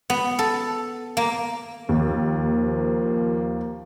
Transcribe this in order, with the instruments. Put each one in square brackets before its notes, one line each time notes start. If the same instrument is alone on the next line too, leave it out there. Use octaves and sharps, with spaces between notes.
[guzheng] B3
A4
A#3
[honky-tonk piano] D#2 [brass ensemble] F3 A#3